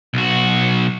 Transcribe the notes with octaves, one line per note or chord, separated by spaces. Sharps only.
B1 F#4